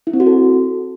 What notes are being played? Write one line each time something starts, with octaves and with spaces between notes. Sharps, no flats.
E4
C4
F#4
A4